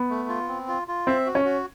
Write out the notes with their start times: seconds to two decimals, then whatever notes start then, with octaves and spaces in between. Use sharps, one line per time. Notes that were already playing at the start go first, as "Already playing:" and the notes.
Already playing: B3
0.10 A3
0.29 F4
0.48 C4
0.68 F4
0.88 F4
1.07 C4 E5
1.26 F#4
1.35 C#4
1.45 F#4